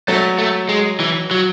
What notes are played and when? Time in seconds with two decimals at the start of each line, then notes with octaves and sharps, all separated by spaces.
0.08 F#3 A3
0.39 A3
0.69 G#3
1.00 E3
1.31 F#3